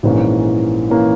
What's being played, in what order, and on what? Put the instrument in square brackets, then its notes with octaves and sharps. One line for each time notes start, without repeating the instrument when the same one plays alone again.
[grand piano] A#1 G#2 E3 A#3 C#4
E3 A#3 C#4